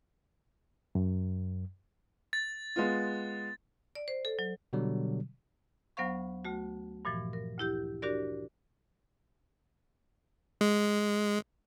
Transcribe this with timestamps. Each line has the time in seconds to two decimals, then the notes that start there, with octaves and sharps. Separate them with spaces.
0.95 F#2
2.33 A6
2.76 G#3 B3 F4
3.95 D5
4.08 C5
4.25 A4
4.39 F#3
4.73 B2 D3 F#3 G3
5.97 D2 F#3 B3 C5 F5 C#6
6.45 D2 A3 F#4
7.05 G2 A#2 E3 F3
7.33 A#4
7.58 D2 E4 G4 G6
8.02 D4 F#4 G4 A#4 D5
10.61 G#3